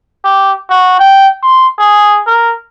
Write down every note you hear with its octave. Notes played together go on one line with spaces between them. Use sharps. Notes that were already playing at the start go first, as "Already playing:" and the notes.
G4
F#4
G5
C6
G#4
A#4